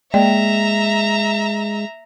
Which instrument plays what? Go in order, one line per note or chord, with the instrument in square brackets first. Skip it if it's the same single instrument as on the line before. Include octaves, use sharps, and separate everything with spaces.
[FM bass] G#3 [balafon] A#3 D5 G5 [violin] E5 A#5